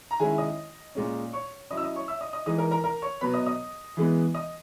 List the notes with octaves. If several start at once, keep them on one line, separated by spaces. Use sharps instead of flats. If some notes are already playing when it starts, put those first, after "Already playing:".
A#5
D#3 G#3 C#4 E4 G#4 G#5
D#5 D#6
A#2 G#3 C#4
C#5 C#6
F#3 C#4 E4 D#5 D#6
E6
D#5 D#6
C#5 C#6
E5 E6
D#5 D#6
D#5 D#6
E3 G#3 D#4 D#5 D#6
A#4 A#5
A#4 A#5
A#4 A#5
C#5 C#6
B2 F#3 B3 B4 B5
D#5 D#6
D#5 D#6
E3 G#3 B3
D#5 D#6